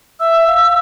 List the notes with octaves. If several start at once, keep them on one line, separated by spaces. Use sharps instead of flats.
E5 E6
F5